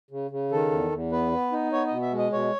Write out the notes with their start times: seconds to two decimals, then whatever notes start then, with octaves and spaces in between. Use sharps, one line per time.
0.11 C#3
0.31 C#3
0.51 D#3 A4
0.71 E2
0.92 E2
1.12 B3 B4
1.32 B3
1.52 D#4
1.72 B3 C#5
1.87 B2 D#5
2.02 E5
2.12 G#3
2.18 D#5
2.32 B2 C#5